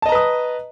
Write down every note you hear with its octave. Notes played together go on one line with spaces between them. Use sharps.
B4 D#5 A5 A#5 D#6